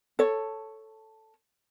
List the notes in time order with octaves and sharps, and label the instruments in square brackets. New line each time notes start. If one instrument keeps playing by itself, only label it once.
[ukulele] A4 C#5